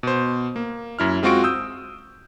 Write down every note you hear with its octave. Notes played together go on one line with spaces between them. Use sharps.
B2 C5
A#3
F#2 E4 F6
G#3 C4 F4 F#4 C#6 D7
D#6 E6 G6